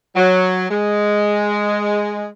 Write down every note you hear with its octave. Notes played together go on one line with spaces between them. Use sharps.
F#3
G#3